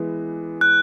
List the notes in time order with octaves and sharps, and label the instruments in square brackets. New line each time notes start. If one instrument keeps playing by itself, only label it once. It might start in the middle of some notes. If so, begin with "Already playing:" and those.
Already playing: [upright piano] E3 G#3 B3
[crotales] F#6